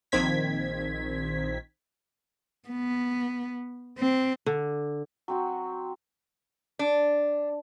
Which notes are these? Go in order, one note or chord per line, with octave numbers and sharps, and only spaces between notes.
A#1 D#3 C4 G#6 B6
B3
C4
D3
F#3 C4 F#4
D4